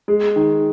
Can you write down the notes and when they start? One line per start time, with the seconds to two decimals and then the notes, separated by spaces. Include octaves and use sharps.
0.08 G#3
0.36 D#3